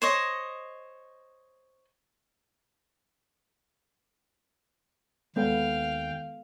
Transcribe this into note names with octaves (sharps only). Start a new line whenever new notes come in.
C5 C#5 D#5
D#2 G#3 B3 A4 F5 G5